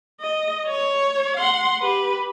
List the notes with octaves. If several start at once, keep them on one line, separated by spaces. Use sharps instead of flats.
D#5
C#5
F#5 C6
G4 B4